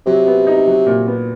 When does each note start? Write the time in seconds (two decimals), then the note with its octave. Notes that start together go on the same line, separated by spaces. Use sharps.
0.06 C3 F#3
0.27 B3
0.47 D#4
0.67 F#3
0.86 A#2
1.07 B3